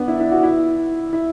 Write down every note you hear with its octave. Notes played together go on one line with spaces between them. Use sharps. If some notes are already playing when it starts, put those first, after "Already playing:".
Already playing: B3 D4
E4
E4
F#4
E4
E4